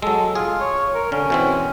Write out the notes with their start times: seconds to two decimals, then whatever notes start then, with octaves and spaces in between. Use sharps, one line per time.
0.02 F#3 G#3 A4
0.35 F4 G#4
0.60 C#5
0.95 A#4
1.12 D3 C#4
1.30 B2 E3 C4